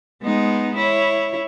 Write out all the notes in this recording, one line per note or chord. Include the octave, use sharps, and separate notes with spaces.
G#3 B3 D#4
E4 C#5